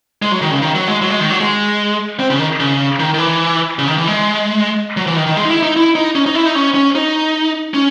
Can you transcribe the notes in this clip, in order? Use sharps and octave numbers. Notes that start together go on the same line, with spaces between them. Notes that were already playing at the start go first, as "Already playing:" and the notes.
G#3
F#3
D#3
C#3
D#3
F#3
G#3
F#3
G#3
D#3
F#3
G#3
C4
C#3
D#3
C#3
D#3
D#3
E3
C#3
D#3
E3
G#3
F#3
E3
D#3
D#3
G#3
D#4
E4
D#4
E4
D#4
C#4
D#4
E4
D#4
C#4
C#4
D#4
C#4